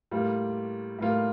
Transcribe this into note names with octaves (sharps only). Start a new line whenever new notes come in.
A2 G3 A#3 F4
A2 G3 A#3 F4